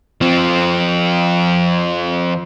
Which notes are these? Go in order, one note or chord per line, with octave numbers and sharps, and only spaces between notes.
F3 C4